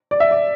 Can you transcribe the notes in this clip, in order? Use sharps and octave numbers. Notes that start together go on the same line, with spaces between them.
D5
E5
D5